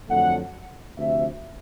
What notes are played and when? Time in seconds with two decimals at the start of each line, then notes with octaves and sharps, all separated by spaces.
0.09 F2 D3 F#3 A3 F#5
0.97 D2 C3 F3 A3 C4 E5